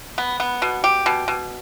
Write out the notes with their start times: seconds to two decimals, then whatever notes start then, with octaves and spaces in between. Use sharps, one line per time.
0.18 B3
0.40 B3
0.62 B2
0.84 G4
1.06 B2
1.28 B2